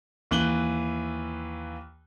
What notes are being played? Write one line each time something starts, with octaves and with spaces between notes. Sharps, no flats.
D#2 E3 F#6 F#7 G7